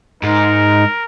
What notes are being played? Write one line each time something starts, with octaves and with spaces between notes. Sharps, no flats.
G#2 D#4 A#4